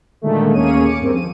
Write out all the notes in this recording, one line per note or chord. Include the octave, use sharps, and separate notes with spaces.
A#2 D3 D#3 G#3 A3
D#2 A#3 C#4 G#4 C#5 D#7
D6 C#7
G2 D#3 C4
F3 D#7